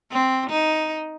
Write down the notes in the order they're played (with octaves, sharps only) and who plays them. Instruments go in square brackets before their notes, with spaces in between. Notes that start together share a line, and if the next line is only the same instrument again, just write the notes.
[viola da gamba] C4
D#4